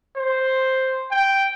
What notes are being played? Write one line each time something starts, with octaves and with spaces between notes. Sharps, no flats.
C5
G5